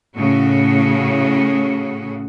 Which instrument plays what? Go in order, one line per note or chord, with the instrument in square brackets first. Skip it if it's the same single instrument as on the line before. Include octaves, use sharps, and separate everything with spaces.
[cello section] A2 C#3 F#4